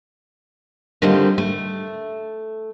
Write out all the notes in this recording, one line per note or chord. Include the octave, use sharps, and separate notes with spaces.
D3 D#3 G3 C4 D#4 F4
A3